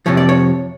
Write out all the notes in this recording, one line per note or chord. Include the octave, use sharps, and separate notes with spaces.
F2 C3 F3 C#5
D5
C#5